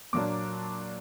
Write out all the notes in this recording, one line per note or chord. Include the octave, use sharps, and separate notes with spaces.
A#2 F#3 A#3 D4 D6